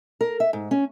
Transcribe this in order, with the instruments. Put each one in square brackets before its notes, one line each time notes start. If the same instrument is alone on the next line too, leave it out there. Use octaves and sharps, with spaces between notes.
[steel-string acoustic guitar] A#4
E5
G#2
C#4